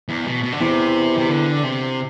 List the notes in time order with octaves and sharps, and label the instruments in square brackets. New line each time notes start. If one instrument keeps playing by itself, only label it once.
[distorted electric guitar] E2
B2
B2
D3
[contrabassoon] E2 [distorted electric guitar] C3
[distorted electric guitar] C3
D3
C3